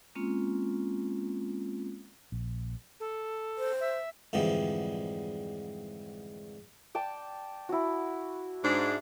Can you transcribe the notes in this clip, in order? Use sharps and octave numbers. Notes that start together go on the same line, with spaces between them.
G#3 A#3 C4 C#4 F4
A#1
A4
C5
E5
F2 G#2 D3 E3 G3
D5 G5 A5
E4 F#4
G#2 D4